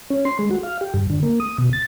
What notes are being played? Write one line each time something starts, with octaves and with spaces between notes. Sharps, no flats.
C#4
C6
G#3
F#4
F5
G4
G2
D3
A#3
D#6
B2
A6